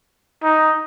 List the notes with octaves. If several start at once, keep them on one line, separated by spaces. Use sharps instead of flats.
D#4